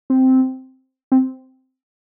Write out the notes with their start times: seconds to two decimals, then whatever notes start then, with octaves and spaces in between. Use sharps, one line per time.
0.10 C4
1.12 C4